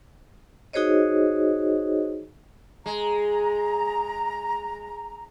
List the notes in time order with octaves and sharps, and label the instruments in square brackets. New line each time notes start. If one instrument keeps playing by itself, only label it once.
[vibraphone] D#4 F#4 G#4 C5 C#5 D#5
[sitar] G#3 [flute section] A#5